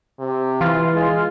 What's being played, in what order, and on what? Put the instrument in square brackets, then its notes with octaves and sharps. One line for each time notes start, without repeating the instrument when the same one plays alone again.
[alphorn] C3
[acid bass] E3 [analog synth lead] F4
[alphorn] G#3